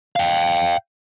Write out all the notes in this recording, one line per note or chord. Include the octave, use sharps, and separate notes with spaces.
F5 G5